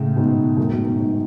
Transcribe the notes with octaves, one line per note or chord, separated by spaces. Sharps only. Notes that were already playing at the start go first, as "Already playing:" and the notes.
Already playing: A2 C#3
G#2 B2
F#2 A2
G#2 B2
B2 D#3
G#2 B2